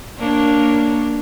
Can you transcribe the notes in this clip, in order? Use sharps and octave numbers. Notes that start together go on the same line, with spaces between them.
A#3 D4 C#5